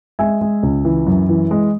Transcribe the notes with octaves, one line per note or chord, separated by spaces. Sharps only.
G#3 E5 G#5
G#3
C#2
E3
F#2
E3
G#3